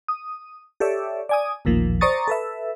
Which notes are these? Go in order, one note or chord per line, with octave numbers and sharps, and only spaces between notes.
D#6
G4 A4 C#5 D5 E5
D5 G#5 D#6
A1 D#2 A#2 F3
C5 D5 A#5 C#6 D#6 A6
A4 B4 E5